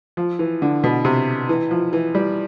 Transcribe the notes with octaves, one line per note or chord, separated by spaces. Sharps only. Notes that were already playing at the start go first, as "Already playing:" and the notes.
F3
E3
D3
B2
C3
E3
F3
E3
G3